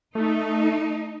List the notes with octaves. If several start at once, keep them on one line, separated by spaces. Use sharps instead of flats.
A3 D#4